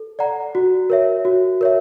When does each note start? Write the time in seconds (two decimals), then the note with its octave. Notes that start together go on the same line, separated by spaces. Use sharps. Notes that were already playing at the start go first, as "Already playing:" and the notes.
Already playing: A4
0.19 D5 F#5 A#5
0.55 F#4
0.90 A#4 C#5 E5
1.25 F#4
1.61 A#4 C#5 E5